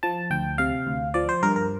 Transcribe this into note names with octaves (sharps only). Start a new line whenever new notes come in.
F3 A5
D2 G5
C3 F5
D2
F3 D5
C5
G2 A#4
A#4